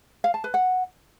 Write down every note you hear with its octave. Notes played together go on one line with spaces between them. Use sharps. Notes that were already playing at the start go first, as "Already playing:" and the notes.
F5
A5
B4
F#5